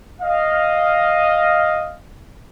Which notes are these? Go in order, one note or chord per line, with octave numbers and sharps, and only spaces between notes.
D#5 F5